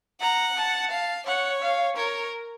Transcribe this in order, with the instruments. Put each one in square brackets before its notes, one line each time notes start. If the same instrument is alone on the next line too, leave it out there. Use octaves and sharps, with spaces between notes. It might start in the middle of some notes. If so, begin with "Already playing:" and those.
[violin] F#5 [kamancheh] A#5
[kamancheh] A5
[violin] F5
[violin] C#5 [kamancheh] F#5
[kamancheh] F5
[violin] A#4 [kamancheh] C#5